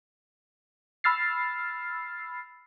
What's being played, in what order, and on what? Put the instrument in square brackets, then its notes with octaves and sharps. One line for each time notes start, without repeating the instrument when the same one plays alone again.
[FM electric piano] B5 E6 F6 A6 C7